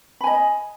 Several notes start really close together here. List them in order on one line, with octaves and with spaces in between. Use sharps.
B5 G#5 D#5